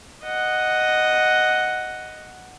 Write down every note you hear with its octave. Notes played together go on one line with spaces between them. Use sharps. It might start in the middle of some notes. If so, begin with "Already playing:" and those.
D#5 F#5